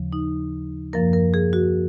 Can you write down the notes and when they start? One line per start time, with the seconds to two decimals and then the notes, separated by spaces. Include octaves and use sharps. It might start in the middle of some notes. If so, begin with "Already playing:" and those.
Already playing: D#2 C#3 F3
0.13 D#4
0.93 F#2 F3 A#3 A#4
1.13 A#4
1.34 G#4
1.53 F#4